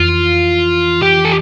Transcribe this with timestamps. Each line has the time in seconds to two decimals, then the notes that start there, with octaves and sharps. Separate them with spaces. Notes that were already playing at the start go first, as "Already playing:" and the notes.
Already playing: F2 E3 F4
1.02 G4
1.25 A4